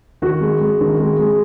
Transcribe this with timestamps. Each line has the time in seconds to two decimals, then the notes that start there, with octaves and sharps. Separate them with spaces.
0.22 D#3 F#4
0.41 G#3
0.61 G#3
0.81 D#3
0.99 G#3
1.19 G#3